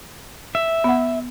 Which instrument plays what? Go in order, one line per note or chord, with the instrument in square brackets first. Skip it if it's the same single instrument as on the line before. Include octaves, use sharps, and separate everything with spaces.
[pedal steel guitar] E5
[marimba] B3 F#5